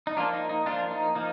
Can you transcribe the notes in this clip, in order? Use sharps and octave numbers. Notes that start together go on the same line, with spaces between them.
D#4
F3 A#3 D4 F4
D#4
D#4
F3 A#3 D4 F4
D#4
F3 A#3 D#4